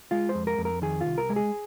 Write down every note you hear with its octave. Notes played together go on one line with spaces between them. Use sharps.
G#3 F4
C5
F2
A#4
F2
A#4
D#3 G#4
F4
C2
A#4
G#3
G#4